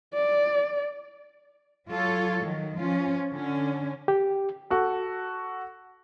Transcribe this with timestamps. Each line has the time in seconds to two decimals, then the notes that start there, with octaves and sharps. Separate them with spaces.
0.14 D5
1.87 F#3 F4 A4 C#5
2.42 D#3 F#3
2.76 F3 C#4 F4
3.31 D3 C#4
4.08 G4
4.70 F#4 A4